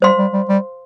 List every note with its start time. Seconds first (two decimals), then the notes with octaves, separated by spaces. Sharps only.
0.02 G3 C5 F5 C6
0.18 G3
0.33 G3
0.49 G3